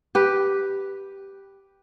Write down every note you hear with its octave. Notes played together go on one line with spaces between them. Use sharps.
G4 B4